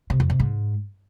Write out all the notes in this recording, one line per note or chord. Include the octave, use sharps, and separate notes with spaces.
C3
F2
C3
G#2